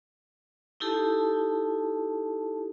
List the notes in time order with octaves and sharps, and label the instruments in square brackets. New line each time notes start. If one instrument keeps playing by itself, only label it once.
[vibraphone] D#4 E4 G4 A4 A5